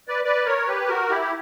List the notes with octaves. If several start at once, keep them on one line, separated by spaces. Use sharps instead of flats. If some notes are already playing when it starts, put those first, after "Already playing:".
B4 D5
B4 D5
A#4 C#5
G4 B4
F#4 A#4
E4 G4
G4